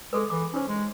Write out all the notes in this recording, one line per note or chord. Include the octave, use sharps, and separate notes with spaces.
G#3 G#4 A4 B4
E3 D6
C#4 D#4 C5
G#3